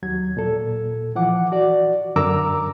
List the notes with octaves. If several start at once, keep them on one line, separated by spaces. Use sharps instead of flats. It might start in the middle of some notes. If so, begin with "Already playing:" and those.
D#2 F#3 G#6
A#2 A4
E3 F3 F#5 D6
F#4 D5
F#2 D3 A#4 A#5 D6 E6